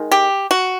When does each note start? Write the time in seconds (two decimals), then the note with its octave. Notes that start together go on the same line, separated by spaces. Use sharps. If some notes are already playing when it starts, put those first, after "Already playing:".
Already playing: D#3 G#3
0.12 G4
0.51 F#4